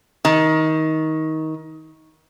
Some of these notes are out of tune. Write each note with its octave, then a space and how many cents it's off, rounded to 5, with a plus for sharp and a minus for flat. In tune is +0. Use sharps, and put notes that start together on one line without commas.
D#3 +20